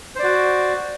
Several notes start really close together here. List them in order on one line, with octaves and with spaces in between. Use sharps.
C5 D5 F#4